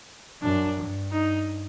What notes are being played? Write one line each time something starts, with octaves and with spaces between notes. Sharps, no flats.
F#2 D4
G2
D#4